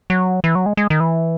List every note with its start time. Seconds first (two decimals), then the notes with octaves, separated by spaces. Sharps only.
0.10 F#3
0.44 E3
0.55 F#3
0.66 G#3
0.77 G#3
0.90 D#3
1.00 E3